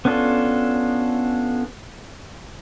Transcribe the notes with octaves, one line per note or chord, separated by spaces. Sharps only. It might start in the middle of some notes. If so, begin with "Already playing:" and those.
B3 C#4 D4 F4 A4